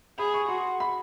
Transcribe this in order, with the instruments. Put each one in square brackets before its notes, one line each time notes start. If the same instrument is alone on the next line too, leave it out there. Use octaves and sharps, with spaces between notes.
[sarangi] G#4 [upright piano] B5
[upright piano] C#6
[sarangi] F#4 [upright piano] C6
[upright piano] B5